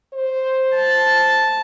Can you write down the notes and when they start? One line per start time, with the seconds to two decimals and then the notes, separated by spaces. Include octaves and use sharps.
0.14 C5
0.75 A5